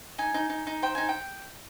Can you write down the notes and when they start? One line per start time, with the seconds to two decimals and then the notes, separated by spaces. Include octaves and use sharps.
0.18 D#4 G#5
0.34 D#4
0.50 D#4
0.67 D#4
0.82 C5 G5
0.95 D#4 G#5
1.09 G5